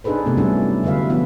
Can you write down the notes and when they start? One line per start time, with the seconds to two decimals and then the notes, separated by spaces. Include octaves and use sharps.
0.04 D4 D#4 G#4 A4 B4 C5
0.26 C3 A3 B3
0.37 F#3 G3 C#4 D4 E4 A4
0.83 D3 F#3 B4 E5 F5
1.10 F3 B3 E4 E5